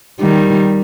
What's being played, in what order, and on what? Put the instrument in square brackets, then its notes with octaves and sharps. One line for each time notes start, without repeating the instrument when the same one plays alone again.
[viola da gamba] D#3 G3